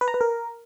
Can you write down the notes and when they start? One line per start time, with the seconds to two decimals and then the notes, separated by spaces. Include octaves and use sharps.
0.01 B4
0.08 A#5
0.14 B4
0.21 A#4